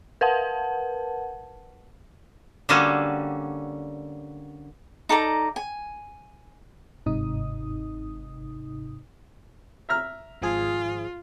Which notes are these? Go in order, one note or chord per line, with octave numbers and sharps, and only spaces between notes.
A#4 B4 F#5 A5
D3 G3 A#3 C#4 F#4 A4
D#4 A4 D5 A#5
G#5
G1 G#2 C3 D#4 D#6
E5 A#5 F6
G#1 F3 F4 G#4